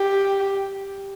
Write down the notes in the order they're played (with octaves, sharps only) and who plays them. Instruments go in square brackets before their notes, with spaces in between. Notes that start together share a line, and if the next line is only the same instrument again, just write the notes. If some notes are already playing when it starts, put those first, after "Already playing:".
Already playing: [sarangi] G4